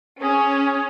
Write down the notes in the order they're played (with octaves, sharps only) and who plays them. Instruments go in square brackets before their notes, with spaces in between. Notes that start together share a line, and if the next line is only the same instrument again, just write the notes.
[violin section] C#4 [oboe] G#4